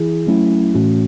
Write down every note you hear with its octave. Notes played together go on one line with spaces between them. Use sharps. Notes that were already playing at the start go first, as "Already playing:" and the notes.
Already playing: E3 E4 G#4
F#3 A3 C#4 E4
A2 E3 A3 C#4 F#4